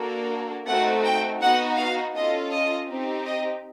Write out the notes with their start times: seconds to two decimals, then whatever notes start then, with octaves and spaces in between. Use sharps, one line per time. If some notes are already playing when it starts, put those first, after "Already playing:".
Already playing: A#3 D4 F#4 A4
0.67 A3 C4 D#4 F#4 F#5
1.04 G5
1.41 B3 D#4 F#4 F#5
1.77 F5
2.14 C#4 F4 A4 D#5
2.51 D#5
2.89 C4 D#4 G4
3.25 D#5